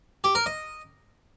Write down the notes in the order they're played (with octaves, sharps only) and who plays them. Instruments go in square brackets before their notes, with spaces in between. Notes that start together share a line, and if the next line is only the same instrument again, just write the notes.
[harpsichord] G4
A#4
D#5